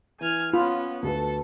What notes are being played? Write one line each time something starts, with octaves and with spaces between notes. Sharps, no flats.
E3 G#5 F6 G#6
B3 C#4 F4 B5
D2 F#4 A4 B4